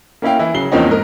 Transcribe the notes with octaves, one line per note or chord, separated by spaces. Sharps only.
A#3 C#4 E4 F5 G5
E3 E4
C#3 F#3 C7 G7
E2 F3 A#3 C4 C#4 D#4
G#2 A#4